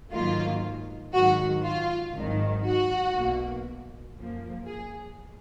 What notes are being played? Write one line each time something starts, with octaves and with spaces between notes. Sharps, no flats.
G#2 D#3 F#3 A#3 F4
G#2 D#3 F#3 F#4
F4
G#1 G#2 D#3 F#3
F#4
B1 B2 A#3
F#2 F3 A#3
G#4